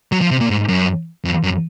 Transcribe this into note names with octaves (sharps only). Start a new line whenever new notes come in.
F#3
F3
C3
A#2
G#2
F#2
F2
F#2